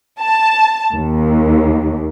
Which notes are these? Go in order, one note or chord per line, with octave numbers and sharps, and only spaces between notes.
A5
D#2